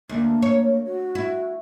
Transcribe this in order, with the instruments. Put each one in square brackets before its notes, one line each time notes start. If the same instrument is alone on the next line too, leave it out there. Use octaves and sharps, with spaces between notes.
[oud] D2 [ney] A#3
[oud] C#5
[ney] F#4
[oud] E4